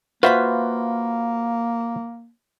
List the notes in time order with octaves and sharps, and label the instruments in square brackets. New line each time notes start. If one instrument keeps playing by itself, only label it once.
[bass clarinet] A#3 [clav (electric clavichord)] F4 F#4 C5 [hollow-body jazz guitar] B4 E5 B5